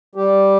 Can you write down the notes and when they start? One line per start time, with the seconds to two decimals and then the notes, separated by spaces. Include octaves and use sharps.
0.15 G3 G4